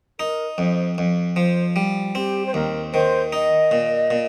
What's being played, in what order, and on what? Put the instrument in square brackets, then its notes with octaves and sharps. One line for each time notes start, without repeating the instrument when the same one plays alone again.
[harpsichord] D#4 [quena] A#4
[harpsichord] F2 [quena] C5
[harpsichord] F2
[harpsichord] F3 [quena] C5
[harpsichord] G3
[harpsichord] C4 [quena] G4
[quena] C5
[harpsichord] D#2 [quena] A#4
[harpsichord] D#3 [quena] C5
[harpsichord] D#4 [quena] D#5
[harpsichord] A#2
A#2